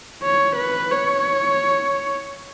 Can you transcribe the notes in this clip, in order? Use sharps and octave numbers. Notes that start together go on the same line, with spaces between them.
C#5
B4
C#5